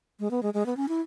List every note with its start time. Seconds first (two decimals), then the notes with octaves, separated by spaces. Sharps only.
0.20 G#3
0.31 B3
0.43 G#3
0.54 G#3
0.66 B3
0.77 C#4
0.89 E4